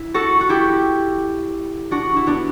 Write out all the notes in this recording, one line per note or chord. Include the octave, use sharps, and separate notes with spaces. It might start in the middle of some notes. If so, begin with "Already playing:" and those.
Already playing: E4
F#4 A4
F#4
E4 G4
D4 F#4
E4
B3 D4